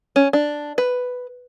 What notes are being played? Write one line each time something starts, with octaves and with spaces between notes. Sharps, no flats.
C#4
D4
B4